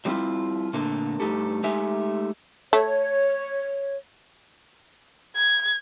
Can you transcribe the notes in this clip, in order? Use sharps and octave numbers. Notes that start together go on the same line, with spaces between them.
F#3 G3 A3 C4 E4 F4
A#2 D3 A3 A#3 A4
G2 B2 A3 D#4 G4 A4
G#3 A3 D#4 G4 E5 G#5
A3 C#5
G#6